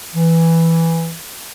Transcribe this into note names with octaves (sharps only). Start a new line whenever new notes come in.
E3